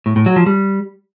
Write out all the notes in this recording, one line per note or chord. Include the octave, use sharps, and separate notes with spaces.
A2
A2
F#3
F3
G3